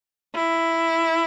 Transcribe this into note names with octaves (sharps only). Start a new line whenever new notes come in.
E4